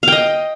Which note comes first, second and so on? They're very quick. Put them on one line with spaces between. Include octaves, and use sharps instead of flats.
F5 G5 D#5